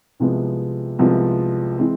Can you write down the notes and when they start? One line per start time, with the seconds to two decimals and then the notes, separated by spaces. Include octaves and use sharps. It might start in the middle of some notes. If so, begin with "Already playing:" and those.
0.20 C2 C3 F3 G#3 B3
0.99 C2 C3 F3 G#3 B3
1.78 E3 G#3 C4